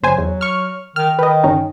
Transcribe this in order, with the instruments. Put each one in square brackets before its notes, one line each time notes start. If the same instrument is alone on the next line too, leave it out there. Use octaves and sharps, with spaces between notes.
[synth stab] G1 C5 G#5 [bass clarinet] F#3
[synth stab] E2
C#6 F6
[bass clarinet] D#3 [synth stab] F6
[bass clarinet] D#3 [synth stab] B4 D#5
[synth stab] G1 C#4 D#4